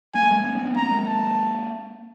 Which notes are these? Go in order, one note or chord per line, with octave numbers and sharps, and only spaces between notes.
A#3 G#5
A3
G#3 A#3
A#3 C4
B3 C#4
B3 C#4
A#3 C4 A#5
G#3 A#3
A5